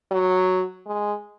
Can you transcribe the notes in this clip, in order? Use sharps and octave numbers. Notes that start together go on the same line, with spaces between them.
F#3
G#3